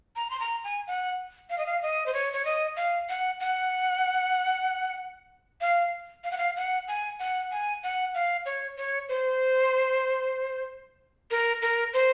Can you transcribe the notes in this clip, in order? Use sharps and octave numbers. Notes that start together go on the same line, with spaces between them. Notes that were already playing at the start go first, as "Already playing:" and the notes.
A#5
C6
A#5
G#5
F#5
F5
D#5
F5
D#5
C5
C#5
C#5
D#5
F5
F#5
F#5
F5
F5
F#5
F5
F#5
G#5
F#5
G#5
F#5
F5
C#5
C#5
C5
A#4
A#4
C5